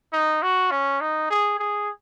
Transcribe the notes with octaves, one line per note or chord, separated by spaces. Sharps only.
D#4
F#4
C#4
D#4
G#4
G#4